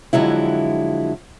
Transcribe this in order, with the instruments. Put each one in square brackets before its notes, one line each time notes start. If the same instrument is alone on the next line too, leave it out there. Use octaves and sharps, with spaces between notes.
[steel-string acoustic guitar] F2 D3 F#3 G#3 E4